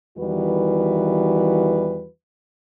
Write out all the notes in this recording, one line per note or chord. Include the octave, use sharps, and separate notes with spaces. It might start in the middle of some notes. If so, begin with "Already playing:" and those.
E2 D#3 E3 G3 F#4 B4